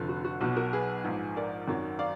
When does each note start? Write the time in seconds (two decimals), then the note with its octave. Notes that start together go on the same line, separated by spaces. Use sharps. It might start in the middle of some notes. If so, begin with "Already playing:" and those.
Already playing: F1 F2 D3
0.09 F#4
0.25 F#4
0.41 B1 B2 F#3 F#4
0.56 F#4 A#4
0.73 G#4 B4
1.04 A#1 G#2 F3
1.37 A#4 D5
1.68 G#1 F#2 D#3 F#3
1.99 D5 F5